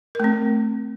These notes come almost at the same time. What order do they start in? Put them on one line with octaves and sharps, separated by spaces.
A#4 A3 C4